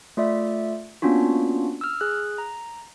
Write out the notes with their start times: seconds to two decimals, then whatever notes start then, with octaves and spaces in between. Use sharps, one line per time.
0.17 A3 F4 D5 E5
1.02 A#3 B3 C#4 D4 F4 F#4
1.81 E6 F6
2.01 G#4 F#6
2.38 A#5